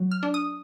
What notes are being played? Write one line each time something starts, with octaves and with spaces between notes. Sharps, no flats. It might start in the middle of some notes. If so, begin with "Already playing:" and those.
Already playing: F#3
F6
D4
D#6